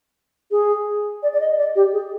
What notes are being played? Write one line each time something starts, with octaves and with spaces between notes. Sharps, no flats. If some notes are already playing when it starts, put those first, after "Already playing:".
G#4
D5
D5
D#5
D5
G4
G#4